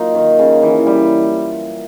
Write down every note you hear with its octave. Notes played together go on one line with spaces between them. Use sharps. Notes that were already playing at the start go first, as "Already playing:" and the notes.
Already playing: F#3 A#3 D#4 F4
D#3
C#3
E3
G3